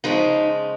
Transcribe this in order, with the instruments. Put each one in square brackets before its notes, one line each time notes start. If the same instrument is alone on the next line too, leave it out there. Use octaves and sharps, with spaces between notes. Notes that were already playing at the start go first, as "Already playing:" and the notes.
[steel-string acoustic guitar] C#3 F3 G#3 D#4